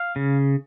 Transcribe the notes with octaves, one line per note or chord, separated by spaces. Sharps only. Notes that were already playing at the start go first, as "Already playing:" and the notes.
Already playing: F5
C#3